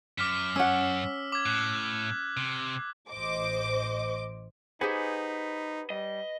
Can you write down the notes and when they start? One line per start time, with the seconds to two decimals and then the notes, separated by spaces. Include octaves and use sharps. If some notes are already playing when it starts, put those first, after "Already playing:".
0.18 F#2 D6 F6 B6
0.56 C#4 F#5 E6
1.32 D6 G#6
1.46 A2 F#6
2.37 C3
3.10 A1 C5 D#5 D6
4.81 D#4 G4 G#4 B4 C5 F#5 G#5
5.90 G3 D#5